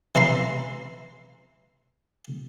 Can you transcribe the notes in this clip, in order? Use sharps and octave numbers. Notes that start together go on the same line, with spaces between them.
E3 E4 A#5 C6